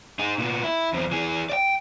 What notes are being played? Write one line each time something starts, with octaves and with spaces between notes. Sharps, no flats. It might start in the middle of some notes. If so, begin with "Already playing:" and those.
D#4 G#4
A#2 B3
E4
E2 C4
E3 G#4
D5 G5